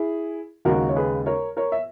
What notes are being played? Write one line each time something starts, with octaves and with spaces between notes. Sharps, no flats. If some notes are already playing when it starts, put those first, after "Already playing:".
Already playing: E4 G#4
D#2 C#3 G#3 F#4 A#4
C#5
G#4 B4
A#4 C#5
A#4 C#5
E5